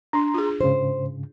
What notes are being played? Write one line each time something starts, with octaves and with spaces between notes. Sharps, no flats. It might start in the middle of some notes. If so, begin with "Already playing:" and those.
D4 A#5 C6
F4 G#4
G#2 C#3 C5